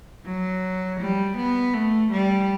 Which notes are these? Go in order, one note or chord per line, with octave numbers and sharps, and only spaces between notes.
F#3
G3
B3
A3
G3